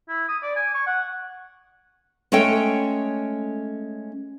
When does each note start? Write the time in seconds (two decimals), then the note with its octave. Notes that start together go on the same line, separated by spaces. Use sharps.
0.09 E4
0.28 D#6
0.43 D5
0.56 G#5
0.75 C#6
0.87 F#5
2.32 G#3 A3 C#4 A4 C#5 G5